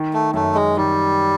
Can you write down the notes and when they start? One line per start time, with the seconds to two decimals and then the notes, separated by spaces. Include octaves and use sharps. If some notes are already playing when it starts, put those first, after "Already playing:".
Already playing: D#3
0.14 A3
0.34 F#2 A3
0.55 G#3
0.77 D#3 G3